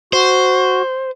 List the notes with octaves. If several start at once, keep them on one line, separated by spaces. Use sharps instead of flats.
F#4 C5